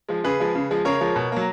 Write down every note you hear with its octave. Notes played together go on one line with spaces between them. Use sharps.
F3 G#3
C#3 G#4 B4
F3 G#3
C#3
F3 G#3
C#3 A#4 C#5
F3 G#3
B2
F#3 A#3